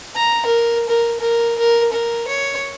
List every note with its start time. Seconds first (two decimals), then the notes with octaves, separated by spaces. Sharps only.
0.15 A#5
0.45 A#4
0.88 A#4
1.19 A#4
1.58 A#4
1.92 A#4
2.27 C#5